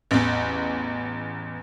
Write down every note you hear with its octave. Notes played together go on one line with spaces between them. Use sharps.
A1 E2